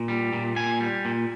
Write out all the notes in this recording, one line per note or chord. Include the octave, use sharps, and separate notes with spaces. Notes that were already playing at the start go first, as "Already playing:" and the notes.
Already playing: A#2
G3
A#2
A#2 G#5
G3
A#2